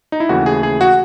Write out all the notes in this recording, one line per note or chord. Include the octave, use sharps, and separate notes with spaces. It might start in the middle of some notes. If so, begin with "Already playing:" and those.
D#4
E4
D#2 C#3 E3 A3 F#4
G#4
G#4
F#4